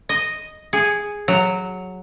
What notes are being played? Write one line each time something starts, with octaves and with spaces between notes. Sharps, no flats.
D#5
G#4
F#3